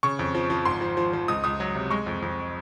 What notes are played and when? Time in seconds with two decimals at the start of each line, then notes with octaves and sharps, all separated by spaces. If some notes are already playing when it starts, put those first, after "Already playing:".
0.03 C#3 C#6
0.19 F2
0.35 F3
0.50 F3
0.65 G#1 C6
0.81 F3
0.97 F3
1.13 F3
1.28 C#2 D#6
1.44 C#2 D#6
1.60 F#3
1.75 C3
1.90 G#3 C#6
2.06 F2
2.22 F2